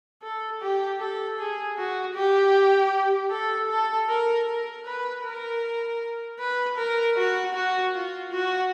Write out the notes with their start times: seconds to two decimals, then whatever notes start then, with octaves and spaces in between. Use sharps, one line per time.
0.22 A4
0.61 G4
1.00 A4
1.39 G#4
1.78 F#4
2.15 G4
3.30 A4
3.69 A4
4.08 A#4
4.47 A#4
4.86 B4
5.24 A#4
6.39 B4
6.77 A#4
7.17 F#4
7.54 F#4
7.94 F4
8.32 F#4